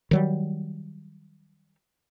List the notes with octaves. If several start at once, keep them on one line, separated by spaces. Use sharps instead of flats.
D#3 F#3 G3